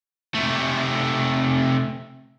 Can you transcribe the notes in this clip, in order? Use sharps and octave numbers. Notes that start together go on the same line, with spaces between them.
C3 A3